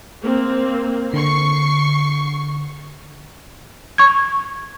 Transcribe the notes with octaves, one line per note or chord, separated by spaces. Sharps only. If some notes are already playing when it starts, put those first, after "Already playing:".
A#3 C4
D3 C#6 C7
C#6 G#6